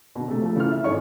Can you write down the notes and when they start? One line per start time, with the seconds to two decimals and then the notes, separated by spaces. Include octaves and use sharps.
0.16 B2 D3
0.28 C3 A3
0.42 F3 A3
0.56 C#3 E3 F4 F6
0.72 E5
0.84 G#1 G#2 C#5 D#5 C#6